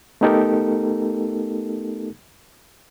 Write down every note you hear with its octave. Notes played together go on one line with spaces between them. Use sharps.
A3 B3 D#4 G4 A4 A#4